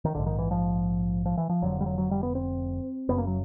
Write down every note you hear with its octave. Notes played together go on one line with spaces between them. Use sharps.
D#3
A#1 G#2 D3
D#3
E3
F3
F3
E3
F3
F1 F2 D3 F#3
G3
F#3
F#3
G3
B3
C4
F#1 F#2 C#3 B3
A#3
F#3